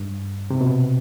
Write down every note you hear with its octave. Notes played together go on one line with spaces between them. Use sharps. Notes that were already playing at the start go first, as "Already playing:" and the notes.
Already playing: G2
C3
B2